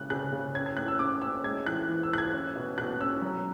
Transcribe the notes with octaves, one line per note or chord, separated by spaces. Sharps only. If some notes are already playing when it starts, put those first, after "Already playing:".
Already playing: C#3 G#3 F#6
C#3 F#6
C#3
C#4 G#6
G#6
A2 F#6
E6
C#4 D6
C#4 E6
G#3 G#6
E3 F#6
E3
E6
E3 F#6
G#6
C#4
B2
B2 F#6
C#4 E6
F#3